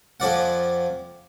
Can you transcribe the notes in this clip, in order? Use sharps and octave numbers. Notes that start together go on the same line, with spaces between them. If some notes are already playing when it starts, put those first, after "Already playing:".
F2 F3 D5 F#5